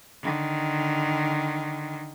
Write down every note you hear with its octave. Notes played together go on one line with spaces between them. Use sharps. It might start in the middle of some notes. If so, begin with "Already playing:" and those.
D3 D#3